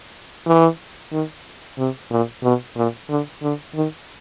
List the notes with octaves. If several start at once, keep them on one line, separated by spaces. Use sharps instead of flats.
E3
D#3
C3
A#2
B2
A#2
D3
D3
D#3